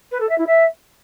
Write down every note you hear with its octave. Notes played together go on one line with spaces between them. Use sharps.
B4
A4
E5
E4
E5